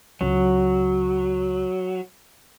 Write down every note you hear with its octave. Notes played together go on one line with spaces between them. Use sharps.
C#2 F#3